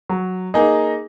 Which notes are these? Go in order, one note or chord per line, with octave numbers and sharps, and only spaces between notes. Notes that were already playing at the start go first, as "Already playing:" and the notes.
F#3
A#3 D#4 G#4 D#5